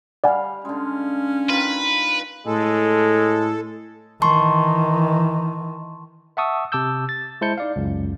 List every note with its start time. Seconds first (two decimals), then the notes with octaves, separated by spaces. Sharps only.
0.24 G3 D5 F5 F#5 G#5
0.65 D3 G#3 C#4
1.49 D#3 F4 B4
2.47 A2 G#3 A4
4.22 D#3 E3 A5 C6 C#6
6.37 E5 F#5 A5 C#6 D#6 E6
6.72 C3 A5 D6 E6 G6
7.09 A6
7.41 G#3 E4 C5 A5 G6 C#7
7.58 D#4 D5 F5
7.76 C#2 F#2